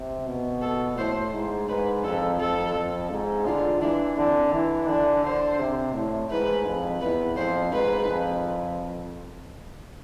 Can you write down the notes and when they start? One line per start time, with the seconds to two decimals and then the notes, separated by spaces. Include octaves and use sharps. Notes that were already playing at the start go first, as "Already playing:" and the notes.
Already playing: C3
0.27 B2
0.62 A4
0.98 A2 C5
1.33 G#2
1.68 G#2 B4
2.04 F2 A4
2.40 F2 A4
2.75 F2
3.11 G#2
3.46 D3 F4
3.82 E3 D4
4.17 D3 C4
4.53 E3
4.88 D3 D4
5.24 D3 C5
5.60 C3
5.94 A2
6.30 G#2 B4
6.66 F2
7.01 E2 B4
7.36 F2 C5
7.72 G#2 B4
8.08 F2